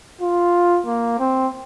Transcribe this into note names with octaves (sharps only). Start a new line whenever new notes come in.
F4
A#3
C4